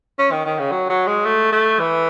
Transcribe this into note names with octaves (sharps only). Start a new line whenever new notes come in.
C#4
D#3
D#3
C#3
F#3
F#3
G#3
A3
A3
E3